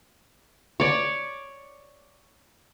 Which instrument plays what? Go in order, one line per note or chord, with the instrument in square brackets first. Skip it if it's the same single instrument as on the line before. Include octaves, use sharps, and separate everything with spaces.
[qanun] C#5 D5